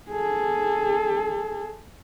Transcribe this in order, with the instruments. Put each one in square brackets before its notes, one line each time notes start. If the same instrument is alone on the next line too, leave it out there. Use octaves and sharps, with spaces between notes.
[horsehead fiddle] G#4 A4